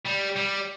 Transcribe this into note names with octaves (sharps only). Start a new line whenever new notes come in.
G3
G3